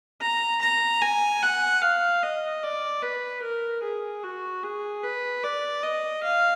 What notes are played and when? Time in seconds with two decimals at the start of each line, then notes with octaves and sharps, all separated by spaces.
0.21 A#5
0.61 A#5
1.02 G#5
1.43 F#5
1.82 F5
2.23 D#5
2.63 D5
3.02 B4
3.42 A#4
3.83 G#4
4.23 F#4
4.63 G#4
5.03 B4
5.43 D5
5.83 D#5
6.23 F5